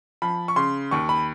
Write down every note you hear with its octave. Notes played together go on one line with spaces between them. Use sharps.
F3 B5
C#6
C#3 C6
D#2 C#6
B5